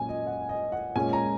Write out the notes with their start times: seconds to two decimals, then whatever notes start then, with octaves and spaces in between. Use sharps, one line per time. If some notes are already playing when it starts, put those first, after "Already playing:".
Already playing: A#2 F#3 C#4 G#5
0.09 D#5
0.27 F#5
0.49 D#5
0.72 F#5
0.96 A#2 G#3 C#4 G#5
1.13 A#5